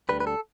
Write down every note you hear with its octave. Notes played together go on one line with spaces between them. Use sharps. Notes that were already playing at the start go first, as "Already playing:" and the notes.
D2 D3 G3 B4
B4
A4